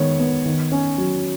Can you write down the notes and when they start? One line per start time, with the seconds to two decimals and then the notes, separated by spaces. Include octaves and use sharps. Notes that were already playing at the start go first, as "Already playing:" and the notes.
Already playing: D#3 G#3 B3 C#5
0.20 B3
0.46 D#3
0.72 C#4
0.98 F#3